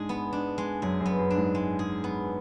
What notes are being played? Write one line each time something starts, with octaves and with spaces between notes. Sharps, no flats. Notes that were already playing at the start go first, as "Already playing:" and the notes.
Already playing: G#2 G#3 D4 G#4
B3
D4
G#3
F#2 G#4
F#2
B3
F#2
D4
G#2
G#3
G#4
B3